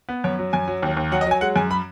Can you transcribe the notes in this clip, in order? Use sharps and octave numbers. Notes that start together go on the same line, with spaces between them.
B3
F#2 C#5
F#3
F#2 G#5
F#3
D#2
D#2
F#3 F#5
D#5
F#3 G#5
G#3 F#5
F#2 G#5
B5